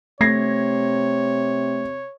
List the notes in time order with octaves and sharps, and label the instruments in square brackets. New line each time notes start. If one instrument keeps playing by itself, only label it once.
[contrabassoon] C3 [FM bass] A3 [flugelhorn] C#5 [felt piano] G#6 A#6 C7